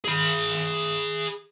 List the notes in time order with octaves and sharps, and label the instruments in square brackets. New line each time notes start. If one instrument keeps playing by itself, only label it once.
[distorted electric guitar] G#4 B5